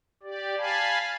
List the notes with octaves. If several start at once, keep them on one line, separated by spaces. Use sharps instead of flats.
G4 D5
F5 G#5 A5 B5